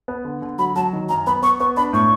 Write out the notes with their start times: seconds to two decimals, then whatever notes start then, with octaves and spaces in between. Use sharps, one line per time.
0.08 B3
0.25 D3
0.42 D3
0.58 F#3 B5
0.76 F#3 A5
0.93 D#3
1.09 F#2 A#5
1.27 B3 B5
1.43 B3 C#6
1.60 B3 C#6
1.77 D4 B5
1.93 A2 C#6